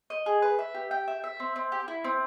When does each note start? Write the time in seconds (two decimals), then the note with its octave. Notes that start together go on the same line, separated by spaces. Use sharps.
0.10 D#5
0.26 G#4
0.42 B4
0.59 E5
0.74 G4
0.91 G5
1.08 E5
1.24 E5
1.40 C4
1.56 C4
1.72 G4
1.88 E4
2.04 C4